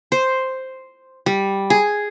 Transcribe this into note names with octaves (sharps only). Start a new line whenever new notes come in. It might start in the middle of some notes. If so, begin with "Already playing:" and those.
C5
G3
G#4